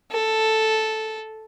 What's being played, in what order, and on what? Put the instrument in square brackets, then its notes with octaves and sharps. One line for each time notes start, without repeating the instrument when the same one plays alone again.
[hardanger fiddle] A4